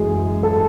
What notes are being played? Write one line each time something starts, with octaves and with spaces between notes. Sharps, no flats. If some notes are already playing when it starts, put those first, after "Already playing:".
Already playing: F#2 E3 G#3 G#4
A4